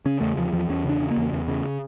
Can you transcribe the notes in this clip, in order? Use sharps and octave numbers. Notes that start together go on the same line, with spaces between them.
C#3 C#4
E2 A3
E2 F3
E2 F3
E2 C#4
C#3 D4
C#3
A#3
E2
E2
C#3